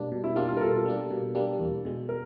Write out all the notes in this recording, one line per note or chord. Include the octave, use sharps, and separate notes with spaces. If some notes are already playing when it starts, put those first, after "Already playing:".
Already playing: B2 G3 A#3 D4
B2
E4
G3 A#3 D4 F4
F4
A#4
B2 A4
G3 A#3 D4
B2
G3 A#3 D4
E2
B2 G#3
A#4